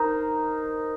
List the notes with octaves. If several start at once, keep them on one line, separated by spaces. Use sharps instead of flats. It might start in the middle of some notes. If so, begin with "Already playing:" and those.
Already playing: D#4 A#4 C5